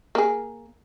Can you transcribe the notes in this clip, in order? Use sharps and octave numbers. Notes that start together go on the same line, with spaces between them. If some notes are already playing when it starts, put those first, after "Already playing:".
A#3 G#4